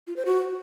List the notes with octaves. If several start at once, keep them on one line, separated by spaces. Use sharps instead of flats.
F4
C5
F#4